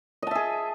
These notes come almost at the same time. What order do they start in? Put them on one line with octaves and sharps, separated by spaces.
D#5 A5 E5 G#4